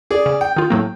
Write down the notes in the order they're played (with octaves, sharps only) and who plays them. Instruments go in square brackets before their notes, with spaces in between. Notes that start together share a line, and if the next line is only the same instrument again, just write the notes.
[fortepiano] G#4 D5
[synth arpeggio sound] C#3
[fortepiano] G5
[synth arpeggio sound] D#3 F4
A2 F#3 A#3